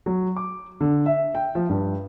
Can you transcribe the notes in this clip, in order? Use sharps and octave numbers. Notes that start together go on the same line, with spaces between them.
F#3
D6
D3
E5
G5
F3
G2